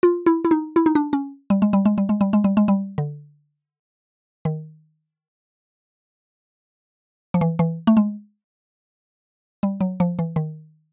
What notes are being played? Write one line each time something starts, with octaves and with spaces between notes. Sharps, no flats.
F4
E4
E4
D#4
E4
D#4
D4
C#4
G3
G#3
G3
G#3
G3
G#3
G3
G#3
G3
G#3
G3
D3
D#3
F3
E3
E3
A3
G#3
G3
F#3
F3
E3
D#3